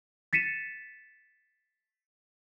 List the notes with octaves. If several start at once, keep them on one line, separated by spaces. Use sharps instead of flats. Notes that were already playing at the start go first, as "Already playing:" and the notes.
A6 B6 C#7 D#7 E7